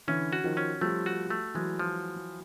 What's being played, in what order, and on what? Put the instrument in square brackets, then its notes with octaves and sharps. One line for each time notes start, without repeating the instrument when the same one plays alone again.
[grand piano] D3 E3 [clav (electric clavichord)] C#4
[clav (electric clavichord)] F#4
[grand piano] D#3 F3
[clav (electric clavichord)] C#4
[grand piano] F3 G3 [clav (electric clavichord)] A3
[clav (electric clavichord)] F#4
A3
[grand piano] E3 F#3 [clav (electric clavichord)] G#3
[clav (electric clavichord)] F3